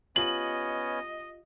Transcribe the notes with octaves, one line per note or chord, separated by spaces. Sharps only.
B3 C#4 F4 G4 D#5 F#7